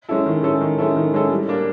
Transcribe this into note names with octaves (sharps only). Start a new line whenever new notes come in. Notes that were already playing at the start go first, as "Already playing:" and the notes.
G#3 C#4 E4 A4
D#3
G#3 C#4 E4 A4
D#3
G#3 C#4 E4 A4
D#3
G#3 C#4 E4 A4
G3
A#3 D4